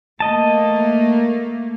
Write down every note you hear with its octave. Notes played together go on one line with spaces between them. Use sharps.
A3 A#3 D#5 A5